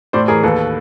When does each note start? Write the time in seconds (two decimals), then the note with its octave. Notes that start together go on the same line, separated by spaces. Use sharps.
0.13 A2 C5 D5
0.28 E3 G#4 A#4
0.43 D#2 A4 B4